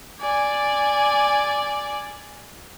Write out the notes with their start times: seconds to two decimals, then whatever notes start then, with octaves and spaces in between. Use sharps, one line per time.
0.21 D5 G#5